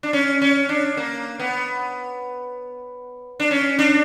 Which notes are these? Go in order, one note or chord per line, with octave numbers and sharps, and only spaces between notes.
D4
C#4
C#4
D4
A#3
B3
D4
C#4
D4